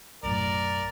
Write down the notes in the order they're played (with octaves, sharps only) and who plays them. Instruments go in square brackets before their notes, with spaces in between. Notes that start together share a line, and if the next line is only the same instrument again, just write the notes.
[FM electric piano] B1 F#2 A2 [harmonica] A#4 D5